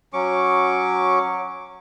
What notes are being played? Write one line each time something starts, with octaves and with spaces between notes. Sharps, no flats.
F#3 C#4 C#6 D6